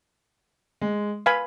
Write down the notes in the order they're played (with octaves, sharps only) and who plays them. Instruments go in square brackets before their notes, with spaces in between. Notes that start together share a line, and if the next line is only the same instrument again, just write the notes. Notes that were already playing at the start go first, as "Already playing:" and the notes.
[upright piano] G#3
[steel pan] B4 F5 G#5 B5